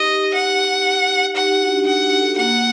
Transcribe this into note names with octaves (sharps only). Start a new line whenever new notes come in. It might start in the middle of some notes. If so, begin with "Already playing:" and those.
Already playing: D#4 G4 D#5
F#5
D#4 G4 F#5
D#4 G4
D4 F#4
D4
D#4 F#5
D#4
F#4 A4
A#3 F#5